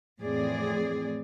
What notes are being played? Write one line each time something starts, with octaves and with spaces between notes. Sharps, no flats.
F2 A2 E3 C4 G#4 D5